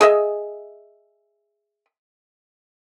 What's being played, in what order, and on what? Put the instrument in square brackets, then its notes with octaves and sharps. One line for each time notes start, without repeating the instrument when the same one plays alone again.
[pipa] G#4 D#5 E5